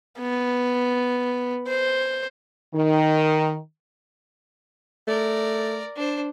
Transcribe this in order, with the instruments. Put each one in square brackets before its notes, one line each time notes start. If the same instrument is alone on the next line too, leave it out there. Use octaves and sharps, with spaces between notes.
[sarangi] B3
C5
[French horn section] D#3
[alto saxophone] A3 [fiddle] A#4 D5
[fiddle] D4 C5